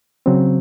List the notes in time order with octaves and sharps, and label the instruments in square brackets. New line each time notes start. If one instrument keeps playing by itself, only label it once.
[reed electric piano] C#3 F#3 C4